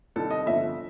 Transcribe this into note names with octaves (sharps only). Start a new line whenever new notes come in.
C2 C3 D#3 A4
D#5
G1 F2 D3 E5